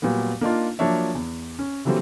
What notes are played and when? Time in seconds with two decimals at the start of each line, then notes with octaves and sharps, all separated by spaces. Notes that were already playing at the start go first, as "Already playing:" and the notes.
0.02 A#2 F#3 G3 B3
0.41 A#3 D4 D#4 F4
0.79 F3 F#3 A#3 D4 C#5 E5
1.15 E2
1.59 C#4
1.85 D3 E3 F#3 G3 A#3 C4